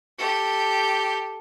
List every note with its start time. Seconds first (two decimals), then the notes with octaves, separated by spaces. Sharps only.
0.18 G4 A4